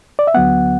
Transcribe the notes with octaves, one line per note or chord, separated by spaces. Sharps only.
D5
E5
D2 D3 F#3 B3 F#5